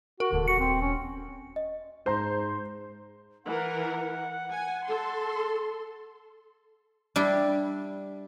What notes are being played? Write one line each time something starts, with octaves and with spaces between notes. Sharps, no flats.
F#4 A#4
D#1 E2 D3
F#4 C#7
C4
C#4
D#5
G#2 C5 A#5 C6
E3 A#4 F#5
G#5
A4 C6
G3 D4 E4